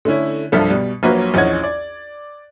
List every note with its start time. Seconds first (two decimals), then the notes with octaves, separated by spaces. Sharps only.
0.05 D3 A3 C#4 E4
0.52 C2 G2 F3 D4 A4 E5
0.70 B2 G3
1.03 A#1 F#3 A#3 F#4 B4 C#5
1.34 A#1 E2 C#4 D#5 F#5 G#6
1.63 D5